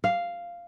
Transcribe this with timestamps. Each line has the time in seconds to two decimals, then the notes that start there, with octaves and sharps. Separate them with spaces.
0.04 F5